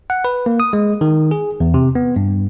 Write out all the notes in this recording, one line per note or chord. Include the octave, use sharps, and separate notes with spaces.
F#5
B4
A#3
D#6
G#3
D#3
G#4
E2
C3
B3
G2